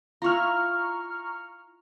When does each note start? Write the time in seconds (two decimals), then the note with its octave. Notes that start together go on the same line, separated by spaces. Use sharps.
0.22 E4 F4 A#5 C#6 F6